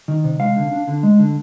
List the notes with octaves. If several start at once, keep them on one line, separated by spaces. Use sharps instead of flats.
D#3
C3
G#3 F5
D3
D4
D3
G#3
D3